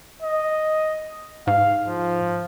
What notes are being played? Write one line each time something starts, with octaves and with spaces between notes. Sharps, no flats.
D#5
G#2 F5
F3